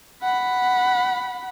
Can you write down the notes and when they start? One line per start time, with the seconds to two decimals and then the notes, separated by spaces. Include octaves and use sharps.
0.23 F#5 B5